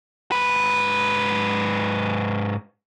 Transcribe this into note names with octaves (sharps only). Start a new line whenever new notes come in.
G#2 B4